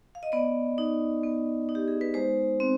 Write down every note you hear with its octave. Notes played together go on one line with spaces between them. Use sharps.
F5
D#5
B3 D5
D#4
B3
D#4
G4
G#4
B4
G#3 C5
C4